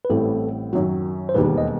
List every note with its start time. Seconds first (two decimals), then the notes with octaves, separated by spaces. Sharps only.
0.05 B4
0.10 A1 A2 G3 C4 A4
0.73 F#2 D#3 F#3
1.29 C5
1.34 E1 D#2 D#3 G3 B4
1.58 D#5